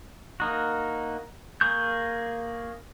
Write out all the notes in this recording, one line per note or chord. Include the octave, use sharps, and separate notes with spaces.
A#3 D#4 F#4
A#3 G#4 C#6 G6